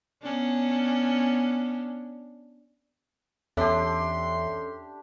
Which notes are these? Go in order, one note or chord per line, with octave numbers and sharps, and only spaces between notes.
B3 C#4 D4
E2 C#4 D4 G4 A4 E5 C6